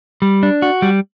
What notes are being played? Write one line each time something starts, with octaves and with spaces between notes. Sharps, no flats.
G3
D4
F#4
G3